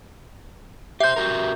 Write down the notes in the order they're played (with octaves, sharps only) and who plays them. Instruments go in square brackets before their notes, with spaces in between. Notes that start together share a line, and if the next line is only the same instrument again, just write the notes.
[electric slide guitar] G4 C5 [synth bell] E5 G6
[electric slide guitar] F#4 G4 A#4